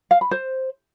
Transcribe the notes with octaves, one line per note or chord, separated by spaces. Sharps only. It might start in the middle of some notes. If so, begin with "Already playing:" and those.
F5
B5
C5